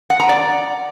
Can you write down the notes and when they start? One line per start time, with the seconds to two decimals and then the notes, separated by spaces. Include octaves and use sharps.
0.10 F#5
0.20 A#5
0.29 D5